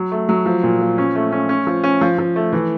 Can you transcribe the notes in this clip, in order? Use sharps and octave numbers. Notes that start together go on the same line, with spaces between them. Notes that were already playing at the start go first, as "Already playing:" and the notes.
Already playing: F#3
A3
F#3
F3
A#2
F3
C#4
A3
C#4
C#4
F3
C#4
F3
F3
A3
E3